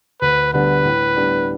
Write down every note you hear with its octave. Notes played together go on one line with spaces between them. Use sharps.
D2 B4
D3 G3 B3 D4 B4
A2
G3 B3 D4